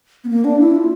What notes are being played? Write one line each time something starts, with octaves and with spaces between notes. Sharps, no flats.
B3
A#3
D4
E4
F4